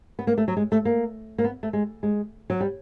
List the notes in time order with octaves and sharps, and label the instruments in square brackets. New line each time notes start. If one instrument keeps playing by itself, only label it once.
[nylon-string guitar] B3
A#3
A3
F#3
G#3
A3
A#3
A#3
B3
A3
G#3
G#3
F#3
G3